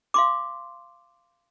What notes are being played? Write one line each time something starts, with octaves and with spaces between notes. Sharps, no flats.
F5 C6 D6